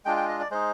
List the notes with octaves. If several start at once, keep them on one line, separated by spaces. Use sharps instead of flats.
G#3 D4 F4 G5
G5
D#5
D5
G#3 D#4 C5